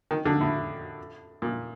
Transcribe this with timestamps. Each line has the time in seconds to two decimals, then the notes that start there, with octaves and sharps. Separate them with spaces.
0.11 D#3
0.25 D3
0.40 A2
1.42 A#2